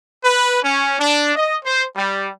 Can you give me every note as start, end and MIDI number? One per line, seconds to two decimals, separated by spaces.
0.23 0.63 71
0.63 0.96 61
0.99 1.32 62
1.35 1.56 75
1.65 1.85 72
1.97 2.29 55